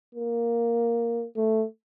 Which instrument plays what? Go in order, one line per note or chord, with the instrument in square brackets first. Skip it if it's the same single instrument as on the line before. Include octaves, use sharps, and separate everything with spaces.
[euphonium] A#3
A3